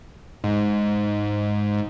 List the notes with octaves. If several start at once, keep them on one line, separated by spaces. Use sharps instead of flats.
G#2